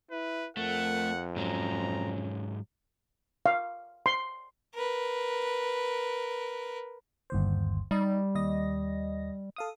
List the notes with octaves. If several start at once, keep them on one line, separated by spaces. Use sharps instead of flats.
E4 B4
F2 A3 A#4 F#5
G#2 F#3 C#4 A#5
F5
C6
A#4 B4
G1 D#2 C5
G3 D#4 D#5
D#2 D#5 A#6
A4 F5 D#6